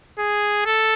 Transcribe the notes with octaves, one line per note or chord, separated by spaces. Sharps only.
G#4
A4